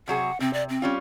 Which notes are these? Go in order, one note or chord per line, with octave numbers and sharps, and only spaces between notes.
C3 F#3 G#4 F#5
C3 C4
D5
C4
G3 C#4 F4